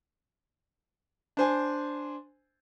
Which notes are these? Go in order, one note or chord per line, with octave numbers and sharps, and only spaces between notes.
D4 C5 G#5